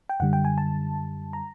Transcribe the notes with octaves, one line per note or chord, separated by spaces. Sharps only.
G5
F#2 D3 G3 F#5
G5
G#5
A5
A#5